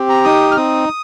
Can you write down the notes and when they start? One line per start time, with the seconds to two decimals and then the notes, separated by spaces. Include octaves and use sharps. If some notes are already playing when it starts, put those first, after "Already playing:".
Already playing: C4 G4
0.09 A#5
0.25 D#4 D#6
0.51 F6
0.56 C4 D#6